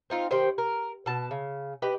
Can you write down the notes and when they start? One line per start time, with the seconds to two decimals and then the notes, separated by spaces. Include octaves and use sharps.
0.10 C4 D#4 F4
0.31 D#3 G4 C5 G5
0.58 A#4
1.06 B2 A5
1.31 C#3
1.82 G4 B4 D#5